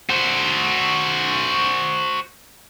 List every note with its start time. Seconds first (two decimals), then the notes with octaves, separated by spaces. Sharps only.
0.09 F#4 C5